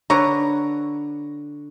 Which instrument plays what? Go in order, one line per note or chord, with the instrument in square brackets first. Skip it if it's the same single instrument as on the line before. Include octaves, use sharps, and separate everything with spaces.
[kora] D3 B4 [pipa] C#5 A#5